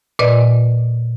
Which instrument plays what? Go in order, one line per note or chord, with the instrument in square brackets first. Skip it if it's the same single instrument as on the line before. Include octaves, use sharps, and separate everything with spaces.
[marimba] A#2 B4 D5 D#5